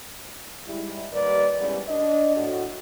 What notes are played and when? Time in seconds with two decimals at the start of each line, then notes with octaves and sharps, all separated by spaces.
0.66 G#2 G3 E4
1.13 D#2 G3 A#4 B4 D5
1.59 E2 G#2 G3 B3 C#4 D5
1.89 D4 D#5
2.37 A2 F#4